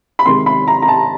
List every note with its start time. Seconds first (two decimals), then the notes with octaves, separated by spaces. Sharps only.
0.19 B5
0.25 C3 D#3 G#3 C6
0.46 B5
0.68 A#5
0.82 A#5
0.88 A5